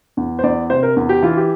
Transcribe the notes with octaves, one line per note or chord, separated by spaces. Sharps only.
E2
C5
E2 D5
C3 C5
A#4
E2
G4
E3 F4
G4